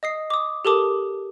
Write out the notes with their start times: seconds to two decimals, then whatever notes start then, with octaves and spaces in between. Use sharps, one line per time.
0.03 D#5 D#6 C7
0.30 D6 D#6
0.65 G4 A4 A#4 A5 D6 D#6